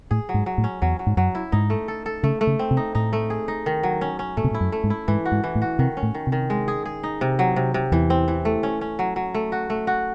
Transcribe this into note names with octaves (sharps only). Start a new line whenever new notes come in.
A2 G#4
F#3
G#2
F#3
A2
C#4
E2 F#3
F#3
G#2
F#2 F#3
E4
G#2 D#4
A3
A4
A4
C#3 A3
A3
C#3
C4
C3
D#4
A2 D#4
A3
G#4
D#4
D#3
F#3
C#4
C#4
A2 A3
C3
A2
E4
F#2
A3
G#2
E4
G#2 E3
F#4
G#2
E3
A2
F#4
C3 D#3
C#4
A2
D#3
C3
D#3
G#3
G#4
G#4
D#4
C3
F#3
C3
C3
E2 E3
C4
E3
A3
C#4
C#4
F#3
F#3
A3
F#4
A3
F#4